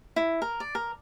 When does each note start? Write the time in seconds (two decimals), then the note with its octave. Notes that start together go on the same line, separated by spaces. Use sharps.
0.16 E4
0.42 A#4
0.60 D5
0.75 A#4